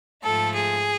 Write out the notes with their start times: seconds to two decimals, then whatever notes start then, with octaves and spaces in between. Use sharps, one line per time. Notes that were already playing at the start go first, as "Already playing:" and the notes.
0.23 G#2 F3 A3 A4
0.55 G#4